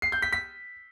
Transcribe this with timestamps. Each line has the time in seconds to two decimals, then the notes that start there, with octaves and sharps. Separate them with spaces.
0.02 C7
0.12 G6
0.22 B6
0.33 B6